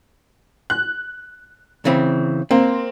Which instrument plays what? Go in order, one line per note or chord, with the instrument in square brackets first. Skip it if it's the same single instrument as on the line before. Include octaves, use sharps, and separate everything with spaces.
[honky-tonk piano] F#6
[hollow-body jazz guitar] C#3 E3 C4
[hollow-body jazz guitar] A#3 [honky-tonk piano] C4